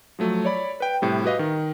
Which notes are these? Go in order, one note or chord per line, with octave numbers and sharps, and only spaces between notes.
F3 F#3 A3
C#5 D5 B5
B4 G5
A2 C3 G3
F#4 G4 B4 D#5 F5
D#3